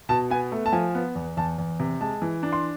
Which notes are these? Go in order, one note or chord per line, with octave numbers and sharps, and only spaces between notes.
B2 A5
B3 G#5
A3
A5
F3 G#5
B3
E2
E2 A5
E2
C3
G#3 A5
E3
D4
C6